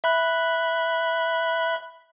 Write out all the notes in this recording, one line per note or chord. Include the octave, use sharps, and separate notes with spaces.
E5 B5 F#6